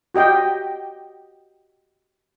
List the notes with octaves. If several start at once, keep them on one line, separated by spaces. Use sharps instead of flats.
F#4 G4 D#5 G5